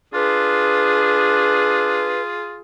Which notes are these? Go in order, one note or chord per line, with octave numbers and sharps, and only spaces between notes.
D4 F4 G#4 B4